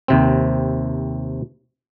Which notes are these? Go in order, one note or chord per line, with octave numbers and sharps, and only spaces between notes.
D#2 C3 C4